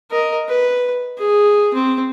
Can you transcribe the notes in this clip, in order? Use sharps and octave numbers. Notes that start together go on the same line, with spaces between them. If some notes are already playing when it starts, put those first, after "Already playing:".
A#4 D#5
B4
G#4
C4